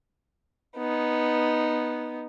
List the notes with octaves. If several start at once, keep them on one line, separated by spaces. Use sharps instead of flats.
B3 D#4